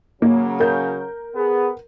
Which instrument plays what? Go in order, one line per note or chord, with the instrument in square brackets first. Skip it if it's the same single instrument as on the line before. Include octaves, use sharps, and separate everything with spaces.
[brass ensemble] C#3 F#3 [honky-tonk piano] A#3
[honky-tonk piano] A#4 G6
[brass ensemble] B3 G#4